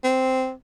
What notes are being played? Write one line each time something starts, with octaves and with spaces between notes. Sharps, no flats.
C4